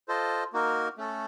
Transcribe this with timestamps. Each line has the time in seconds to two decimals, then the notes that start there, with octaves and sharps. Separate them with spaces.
0.08 F4 A4 C5 D#5
0.53 A#3 D#4 F#4 A#4
0.98 A3 C#4 A4